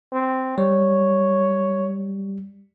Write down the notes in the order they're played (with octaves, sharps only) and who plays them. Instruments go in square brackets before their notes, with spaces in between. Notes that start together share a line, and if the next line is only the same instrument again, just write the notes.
[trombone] C4
[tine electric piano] G3 [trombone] C#5